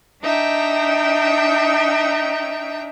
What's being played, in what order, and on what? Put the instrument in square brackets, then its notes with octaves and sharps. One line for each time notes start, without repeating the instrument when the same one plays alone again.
[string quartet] D4 D#4 E5 G5